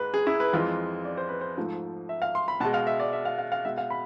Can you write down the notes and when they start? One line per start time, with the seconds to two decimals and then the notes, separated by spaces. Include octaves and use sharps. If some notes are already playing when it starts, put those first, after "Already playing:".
Already playing: G#2 G#3 B4
0.14 G#4
0.27 E4
0.40 B4
0.53 F2 E3 G#3 F4
1.05 D5
1.17 C5
1.29 B4
1.41 C5
1.57 G#2 F3 A3
2.09 E5
2.22 F5
2.35 C6
2.48 B5
2.60 B2 A5
2.65 G#3
2.74 F5
2.87 E5
3.00 D5
3.13 E5
3.25 F5
3.38 F5
3.52 F5
3.65 B2 G#3 E5
3.78 F5
3.90 B5